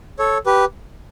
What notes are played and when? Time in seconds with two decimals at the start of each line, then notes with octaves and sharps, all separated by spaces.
0.19 A4 C#5
0.46 G4 B4